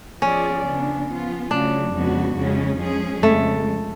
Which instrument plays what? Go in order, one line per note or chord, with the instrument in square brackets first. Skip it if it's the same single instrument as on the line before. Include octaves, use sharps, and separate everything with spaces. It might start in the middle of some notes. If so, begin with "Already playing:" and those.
[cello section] F3 B3 F4 G#4 D5 [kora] C#4
[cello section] C#3 F3 B3 D4
F3 B3 F4
[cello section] C#3 F#3 A3 [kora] D4
[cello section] F2 C#3 G#3 B3 F#4
F2 C#3 G#3 C#4
F3 G#3 C#4 G#4
[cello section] F2 C#3 G#3 [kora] A3